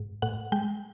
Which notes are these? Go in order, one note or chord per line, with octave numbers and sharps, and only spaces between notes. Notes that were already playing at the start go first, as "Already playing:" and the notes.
Already playing: G#2
A2 F#5
G#3 G5